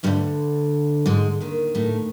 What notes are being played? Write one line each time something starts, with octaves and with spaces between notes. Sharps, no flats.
D2 G2 D3 G3
G#2 G#3
D#2 D#3
A2 A3